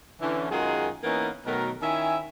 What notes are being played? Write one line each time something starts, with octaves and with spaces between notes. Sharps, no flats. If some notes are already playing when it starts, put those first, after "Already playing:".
D3 E3 C#4
F#2 D#3 G#3 F4 G#4 F#5
E3 A#3 B3 C#4 D#4
B2 D#3 F#3 A3 A#4
D#3 C#4 E4 E5 G#5